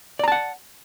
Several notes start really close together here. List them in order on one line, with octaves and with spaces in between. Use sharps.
D5 A#5 A5 F#5